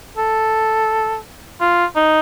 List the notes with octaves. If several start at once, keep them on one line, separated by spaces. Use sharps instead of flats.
A4
F4
D#4